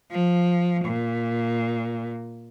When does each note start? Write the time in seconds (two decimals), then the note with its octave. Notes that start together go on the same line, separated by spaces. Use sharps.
0.11 F3
0.85 A#2